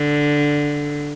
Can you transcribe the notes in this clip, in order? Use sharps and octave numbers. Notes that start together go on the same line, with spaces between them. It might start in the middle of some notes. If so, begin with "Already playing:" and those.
Already playing: D3